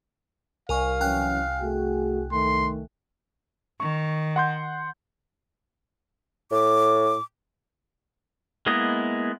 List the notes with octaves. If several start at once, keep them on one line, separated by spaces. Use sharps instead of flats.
C2 A#4 F5 G#5 C#6
E3 F#3 C#4 G5 G#5 F#6
A3 F#4 G#4
D#3 A3 C6
D#3 C#6
F#5 C6 G6
A2 D6
G#3 A#3 B3 E4 D#5